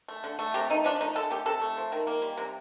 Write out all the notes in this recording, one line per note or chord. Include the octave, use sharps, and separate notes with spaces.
A3
D3
A3
C3 G4
A3 D#4
F3 D4
A3 D#4
D3 A4
A3 G4
C3 A4
A3
F3
D#3
A#3
G3
C3